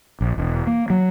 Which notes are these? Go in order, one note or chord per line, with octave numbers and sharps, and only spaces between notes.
A#1
E1
A#3
F#3